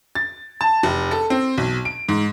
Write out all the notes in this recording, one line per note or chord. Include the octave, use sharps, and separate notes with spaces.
A6
A5
F1
A4
C4
B1
D7
G#2